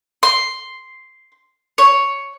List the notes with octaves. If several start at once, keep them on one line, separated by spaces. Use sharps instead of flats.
C6
C#5